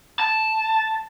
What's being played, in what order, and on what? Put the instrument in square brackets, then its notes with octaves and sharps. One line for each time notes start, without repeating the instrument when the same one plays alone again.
[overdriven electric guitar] A5